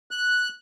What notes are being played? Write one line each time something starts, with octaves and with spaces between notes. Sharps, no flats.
F#6